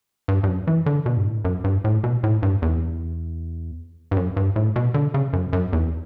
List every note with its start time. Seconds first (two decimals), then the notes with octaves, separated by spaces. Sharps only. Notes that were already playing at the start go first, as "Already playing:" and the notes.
0.28 G2
0.43 G2
0.48 F#2
0.67 E3
0.86 D3
1.06 B2
1.17 G2
1.26 A2
1.45 F#2
1.64 G2
1.84 A2
2.04 B2
2.23 A2
2.43 G2
2.62 E2
4.11 G2
4.17 F#2
4.37 G2
4.56 A2
4.76 B2
4.94 D3
5.14 C#3
5.33 F#2
5.53 F#2
5.73 E2